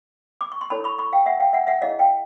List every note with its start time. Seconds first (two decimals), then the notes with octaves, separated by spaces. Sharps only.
0.41 D6
0.52 C#6
0.61 C6
0.70 E4 A4 C#5 A5 B5
0.84 B5 C#6
0.98 B5 C#6
1.13 F5 G5
1.26 E5 F#5
1.40 F5 G5
1.53 E5 F#5
1.67 E5 F#5
1.81 E4 G#4 C#5 D#5 F5
1.99 F5 G5